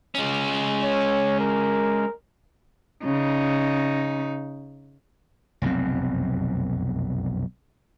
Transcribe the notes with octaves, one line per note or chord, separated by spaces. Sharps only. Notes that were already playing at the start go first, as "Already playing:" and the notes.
G#3 C#4
C#5
A#4
C#3 D#4
F1 B1 F#2 C4